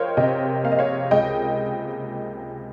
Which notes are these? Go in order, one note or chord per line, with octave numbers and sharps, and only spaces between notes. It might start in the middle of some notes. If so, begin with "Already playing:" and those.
Already playing: F3 A#4 C5 C#5 D#5 F5 G5
C3 D#5 G5
A#3 F5
D#5
C#5 F5
C#2 D#5 G5